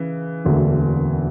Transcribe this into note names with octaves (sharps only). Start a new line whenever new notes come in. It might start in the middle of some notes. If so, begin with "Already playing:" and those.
Already playing: C#3 E3
E1 D2 D3 A#3